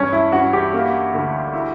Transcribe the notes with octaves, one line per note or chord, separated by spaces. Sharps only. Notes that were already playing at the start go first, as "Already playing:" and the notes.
Already playing: E2 G2 C#4
E4
G2 F#4
G4
A#3
D2
E4